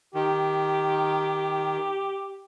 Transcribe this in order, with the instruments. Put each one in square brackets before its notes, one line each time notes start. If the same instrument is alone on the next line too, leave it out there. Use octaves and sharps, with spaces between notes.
[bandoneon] D#3 [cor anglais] G4